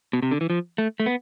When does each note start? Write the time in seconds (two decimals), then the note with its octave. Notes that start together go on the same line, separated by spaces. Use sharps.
0.13 B2
0.23 C3
0.31 D3
0.41 E3
0.50 F3
0.78 A3
1.00 A3
1.06 B3